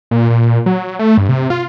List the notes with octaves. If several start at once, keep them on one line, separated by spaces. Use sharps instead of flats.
A#2
A#2
F#3
A3
G2
C3
F4